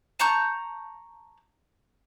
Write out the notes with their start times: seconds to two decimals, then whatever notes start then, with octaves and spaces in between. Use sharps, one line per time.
0.19 A5 A#5 C#6 G6